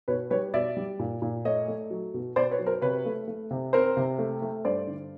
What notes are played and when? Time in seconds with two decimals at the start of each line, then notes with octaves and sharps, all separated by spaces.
0.08 B2 B4 C#5
0.30 G3 B4 C#5
0.54 B2 D5 E5
0.77 G3
0.99 A#2
1.22 A#2
1.45 A3 C#5 D#5
1.68 A3
1.90 F#3
2.14 B2
2.36 B2 C5 D5
2.51 B4 C#5
2.59 F#3
2.66 A#4 C5
2.81 C3 B4 C#5
3.05 A3
3.28 A3
3.51 C3
3.73 C4 A#4 C5
3.97 C3
4.19 A3
4.42 A3
4.65 G2 C5 D5
4.87 D3